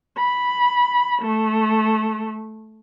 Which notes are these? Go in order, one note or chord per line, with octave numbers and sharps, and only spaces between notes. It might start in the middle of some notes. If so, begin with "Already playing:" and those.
B5
A3